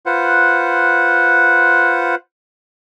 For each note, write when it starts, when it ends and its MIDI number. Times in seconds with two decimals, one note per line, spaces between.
0.06 2.15 65
0.06 2.15 71
0.06 2.15 72
0.06 2.15 78